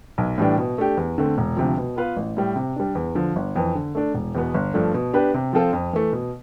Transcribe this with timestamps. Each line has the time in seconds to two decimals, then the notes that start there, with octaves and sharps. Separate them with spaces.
0.18 B1
0.38 A2 E3 G3 D4
0.58 B2
0.78 A3 D4 G4
0.97 E2
1.18 D3 A3 C4
1.38 E1
1.57 D2 C3 F3
1.77 B2
1.96 B3 F4 B4 F5
2.17 A1
2.37 A2 G3
2.56 C3
2.76 G3 D4
2.95 E2
3.15 D3 F3
3.36 G1
3.56 F2 E3
3.75 D3
3.95 A3 D4
4.14 E1
4.35 E2 B2 B3
4.54 G1
4.74 G2 F3 A3 D4
4.94 B2
5.13 B3 D4 G4 B4
5.34 C3
5.53 F3 C4 F4 A4
5.73 F2
5.93 E3 A3
6.13 B2